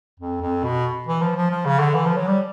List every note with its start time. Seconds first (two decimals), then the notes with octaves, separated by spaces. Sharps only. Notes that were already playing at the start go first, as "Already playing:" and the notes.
0.19 F2
0.41 F2
0.64 B2
1.07 E3
1.21 F3
1.36 F3
1.51 F3
1.65 C#3
1.80 D3
1.95 E3
2.06 F3
2.17 F#3
2.27 G3